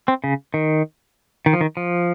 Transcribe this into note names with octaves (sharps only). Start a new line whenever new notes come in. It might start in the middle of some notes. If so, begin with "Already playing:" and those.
C4
C#3
D#3
D#3
F3
D#3
F3